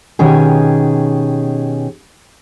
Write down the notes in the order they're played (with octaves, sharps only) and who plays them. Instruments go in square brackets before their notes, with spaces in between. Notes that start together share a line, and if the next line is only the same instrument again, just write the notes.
[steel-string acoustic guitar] B2 D#3 C#4 G4 G#4